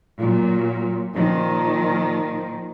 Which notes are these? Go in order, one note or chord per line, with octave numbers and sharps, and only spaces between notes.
A#2 F#3
A#2 D#3 F3